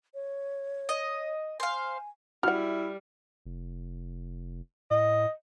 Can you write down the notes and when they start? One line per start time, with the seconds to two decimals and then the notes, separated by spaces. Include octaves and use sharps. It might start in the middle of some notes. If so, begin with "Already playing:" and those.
0.14 C#5
0.89 D#5
1.60 C5 F5 G#5
2.43 G3 E4 F#4 F#5 F6
3.46 F1
4.91 A2 D#5